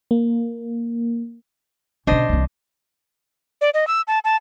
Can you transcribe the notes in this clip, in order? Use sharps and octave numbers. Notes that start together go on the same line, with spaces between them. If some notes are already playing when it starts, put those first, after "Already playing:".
A#3
B1 C#3 D4 C5 D#5
C2 E3
D5
D#5
E6
A5
A5